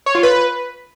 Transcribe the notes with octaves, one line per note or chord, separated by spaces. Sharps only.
C#5
F4
B4